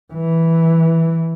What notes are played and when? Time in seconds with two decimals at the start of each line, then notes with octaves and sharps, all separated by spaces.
0.13 E3